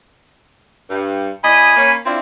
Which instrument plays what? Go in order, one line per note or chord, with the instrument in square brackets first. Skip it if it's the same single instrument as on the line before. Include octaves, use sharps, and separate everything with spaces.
[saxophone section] G2
[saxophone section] E2 D#5 [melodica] G#5 B5
[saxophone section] A#3 C#4
[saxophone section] C4 D4 E4 [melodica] F4